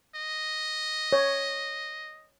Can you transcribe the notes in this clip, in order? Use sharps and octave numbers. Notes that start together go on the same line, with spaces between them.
D#5
C#5